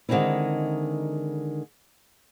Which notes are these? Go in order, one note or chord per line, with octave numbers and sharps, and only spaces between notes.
D3 D#3 G#3 C4 D#4 E4